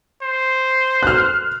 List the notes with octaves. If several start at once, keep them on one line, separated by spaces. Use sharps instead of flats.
C5
F6 F#6